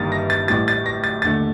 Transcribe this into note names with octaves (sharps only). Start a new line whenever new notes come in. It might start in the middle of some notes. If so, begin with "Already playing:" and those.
Already playing: G1 G2 D#3 G3 A#3 D#6 A6
A#6
A6
A1 A2 G3 A6
A6
A#6
A6
D#2 D3 A3 A6